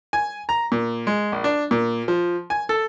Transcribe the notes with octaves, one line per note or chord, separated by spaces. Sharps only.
G#5
A#5
A#2
G#3
A#1
D4
A#2
F3
G#5
A4